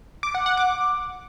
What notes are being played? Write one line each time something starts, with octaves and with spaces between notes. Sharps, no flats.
D6
F#5
F#5
D6